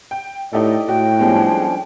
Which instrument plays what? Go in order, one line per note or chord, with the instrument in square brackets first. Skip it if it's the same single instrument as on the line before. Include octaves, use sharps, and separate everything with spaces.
[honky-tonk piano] G5
[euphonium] A2 [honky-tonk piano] D#4 G4 A4 [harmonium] D5 D#5
[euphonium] A2 [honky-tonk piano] F#4 [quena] G5
[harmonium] F3 C#4 D4 [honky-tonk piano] G3 G#3 B3